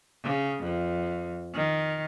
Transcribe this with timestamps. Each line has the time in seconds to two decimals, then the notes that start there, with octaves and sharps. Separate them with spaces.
0.24 C#3
0.63 F2
1.54 D#3